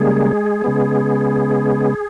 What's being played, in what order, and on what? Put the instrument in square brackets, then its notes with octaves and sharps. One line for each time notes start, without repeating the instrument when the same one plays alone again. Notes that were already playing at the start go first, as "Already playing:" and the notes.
Already playing: [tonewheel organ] C#3 G3 G#3 A#3 G#4
C#3 G#3 B3